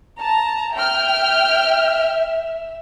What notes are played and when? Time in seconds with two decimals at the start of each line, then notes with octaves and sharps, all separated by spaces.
0.19 A5 A#5
0.75 E5 G5 F6